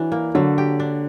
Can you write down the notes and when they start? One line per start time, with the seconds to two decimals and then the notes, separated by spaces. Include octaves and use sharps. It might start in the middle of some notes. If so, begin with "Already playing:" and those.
Already playing: E3 F#3 D4
0.12 A#3
0.35 D3 F#3
0.58 G4
0.80 D4